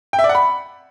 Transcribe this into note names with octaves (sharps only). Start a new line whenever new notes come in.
G5
E5
D5
F#5
B5